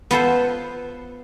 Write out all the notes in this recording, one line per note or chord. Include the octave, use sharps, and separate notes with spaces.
B3 F4 A4 C5